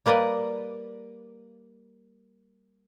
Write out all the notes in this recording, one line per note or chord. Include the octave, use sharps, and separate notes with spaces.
G3 A#3 B4 D5 D#5